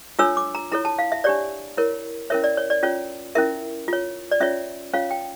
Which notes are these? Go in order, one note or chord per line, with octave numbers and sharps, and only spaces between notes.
D4 F4 A4 C#5 E6
D6
A#5
E4 A4 C#5 A#5
A5
F5
E5
D4 G4 C#5 D5
E4 A#4 C#5
C#4 E4 A#4 C#5 E5
D5
C#5
D5
C#4 F4 C#5
C#4 E4 A#4 E5
F4 C#5
D5
C#4 F4 C#5 E5
C#4 F4 C#5 F5
G5